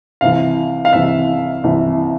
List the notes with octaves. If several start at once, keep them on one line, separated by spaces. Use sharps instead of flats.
C2 C3 E3 F5
F5
C2 C3 E3 E5
C2 C3 E3